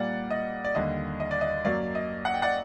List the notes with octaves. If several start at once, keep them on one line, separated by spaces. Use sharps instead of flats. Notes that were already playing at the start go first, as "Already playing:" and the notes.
Already playing: A#2 G3 A#3 D5 F#5
D#5
D5
D#2 D3 G3 D#5
D#5
D5
D#5
F#2 F#3 A#3 D5
D#5
F#5
G5
D5 F#5